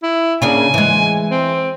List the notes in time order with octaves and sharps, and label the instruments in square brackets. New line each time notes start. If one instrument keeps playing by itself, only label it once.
[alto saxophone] E4
[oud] C#3 A#3 D4 [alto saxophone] G#5
[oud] E3 G#3
[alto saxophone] C4